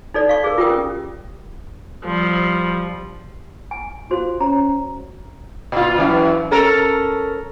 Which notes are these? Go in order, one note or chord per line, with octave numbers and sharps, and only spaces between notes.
D#4 A4 D5
F5 C#6
G#4 A#4
F4 G4 A#4 G5 D#6
C#4
F3 G3
G#5
F4 F#4 C5
C#4 A#5
A#2 F4
F#2 E3
C#4 A4 A#4